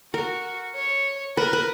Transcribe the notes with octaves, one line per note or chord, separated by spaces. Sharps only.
F#4 A#4
C#5
A#4 B4
B4